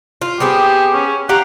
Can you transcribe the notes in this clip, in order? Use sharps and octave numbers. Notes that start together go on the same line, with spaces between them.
F4
B3 C4 G4 G#4
C#4
G4 F5 F#5 A#5